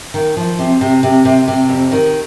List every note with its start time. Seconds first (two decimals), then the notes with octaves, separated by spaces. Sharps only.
0.14 D#3
0.37 F3
0.59 C3
0.81 C3
1.03 C3
1.25 C3
1.48 C3
1.69 F2
1.92 D#3